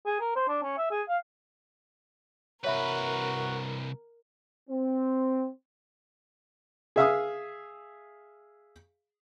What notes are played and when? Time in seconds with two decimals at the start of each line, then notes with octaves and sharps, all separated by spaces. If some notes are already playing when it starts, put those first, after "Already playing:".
0.06 G#4
0.20 A#4
0.36 C5
0.49 D4
0.62 C#4
0.78 E5
0.91 G#4
1.09 F5
2.64 C2 F#4 A#4 B4 C#5 E5 B5
4.69 C4
6.96 G#4 E5 F5 D#6